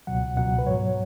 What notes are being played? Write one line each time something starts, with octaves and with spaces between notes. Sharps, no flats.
C#2 B2 F#3 F#5
C#2 B2 F#3 F#5
B4
G#2 F#3 C#5